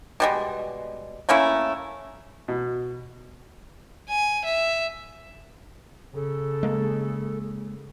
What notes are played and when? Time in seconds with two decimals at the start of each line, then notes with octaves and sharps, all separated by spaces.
0.20 B2 G3 G#3
1.29 A3 A#3 C#4 E4
2.48 B2
4.09 G#5
4.45 E5
6.15 C#3 A4
6.63 G#3 A#3